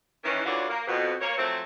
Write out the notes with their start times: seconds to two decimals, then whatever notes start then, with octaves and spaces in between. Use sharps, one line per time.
0.24 D#3 E3 C#4
0.45 D2 E3 F4 F#4 C#5 D5
0.69 A#3
0.87 F2 B2
1.21 A#3 C#5
1.37 F3 F#3 A3 C4